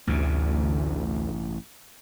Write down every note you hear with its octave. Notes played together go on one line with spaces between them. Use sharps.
A1 D2 G2 C3